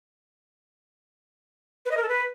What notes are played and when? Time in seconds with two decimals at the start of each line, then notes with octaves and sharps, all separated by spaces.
1.86 B4
1.91 D#5
1.97 A#4
2.03 A4
2.08 B4